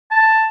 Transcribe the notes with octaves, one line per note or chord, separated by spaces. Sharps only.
A5